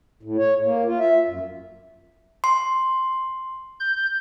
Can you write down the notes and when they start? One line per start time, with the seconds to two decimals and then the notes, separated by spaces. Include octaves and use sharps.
0.23 A2
0.38 C#5
0.64 A#3
0.86 F4
0.99 E5
1.27 F#2
2.44 C6
3.80 G6